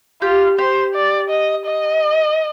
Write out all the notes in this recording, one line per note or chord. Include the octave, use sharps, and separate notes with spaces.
F4 G4
G4 C5
D5
D#5
D#5